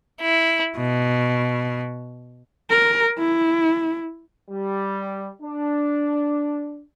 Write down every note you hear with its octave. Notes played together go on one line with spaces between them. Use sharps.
E4
B2
A#4
E4
G3
D4